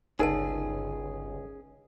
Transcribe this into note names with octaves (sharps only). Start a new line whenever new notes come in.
G1 C#2 C#4 D#4 G#4 A#4 D5 A5